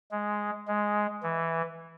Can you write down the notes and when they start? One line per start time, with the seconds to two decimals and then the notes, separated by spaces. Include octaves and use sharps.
0.11 G#3
0.68 G#3
1.23 E3